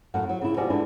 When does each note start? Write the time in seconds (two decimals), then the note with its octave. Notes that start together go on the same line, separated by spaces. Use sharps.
0.14 F#2 A2 F#5
0.29 F#3
0.41 C#3 E4
0.57 B2 F3 F#4 G4 D5 G#5
0.70 D3 E3 G#3 D4 E4